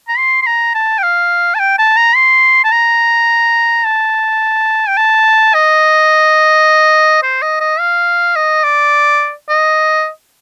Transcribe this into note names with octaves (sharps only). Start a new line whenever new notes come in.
A#5
C6
C6
A#5
A5
G5
F5
A5
G5
A5
A#5
C6
A5
A#5
A5
G5
A5
D#5
C5
D#5
D#5
F5
D#5
D5
D#5